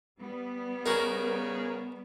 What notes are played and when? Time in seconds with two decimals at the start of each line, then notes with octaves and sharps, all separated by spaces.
0.17 G3 B3
0.86 C#3 D#4 F#4 A#4